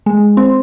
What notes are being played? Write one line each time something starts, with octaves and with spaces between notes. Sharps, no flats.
G#3
C4